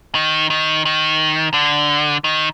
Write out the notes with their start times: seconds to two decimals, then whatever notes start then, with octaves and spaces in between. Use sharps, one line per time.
0.15 D#3
0.50 D#3
0.85 D#3
1.54 D3
2.24 D#3